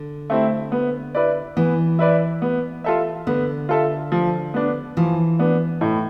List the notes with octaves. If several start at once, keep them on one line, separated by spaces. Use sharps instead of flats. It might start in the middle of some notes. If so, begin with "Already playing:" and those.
Already playing: D3
A3 C4 E4
B3
E4 B4 D5
E3 B3
E4 B4 D5
B3
F4 A4 E5
D3 B3
F4 A4 E5
F3
B3 D4
E3 F3
B3 D4
A2